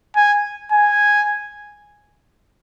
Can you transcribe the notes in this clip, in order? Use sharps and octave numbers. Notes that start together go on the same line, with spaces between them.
G#5
G#5